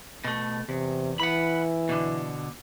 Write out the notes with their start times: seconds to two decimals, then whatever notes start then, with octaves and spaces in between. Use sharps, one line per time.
0.24 B2 A3
0.69 E2 C3
1.20 E3 F#5 B5
1.89 B2 D3